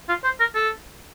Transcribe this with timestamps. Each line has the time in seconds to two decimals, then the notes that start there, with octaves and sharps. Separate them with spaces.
0.09 F4
0.24 C5
0.40 A#4
0.55 A4